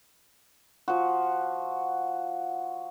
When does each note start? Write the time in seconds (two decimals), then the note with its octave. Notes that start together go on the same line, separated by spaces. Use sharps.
0.88 F3 F#4